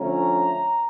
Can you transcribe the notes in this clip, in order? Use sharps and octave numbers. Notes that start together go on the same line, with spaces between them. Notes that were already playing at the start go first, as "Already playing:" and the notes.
Already playing: D3 F3 A3 C#4 A#5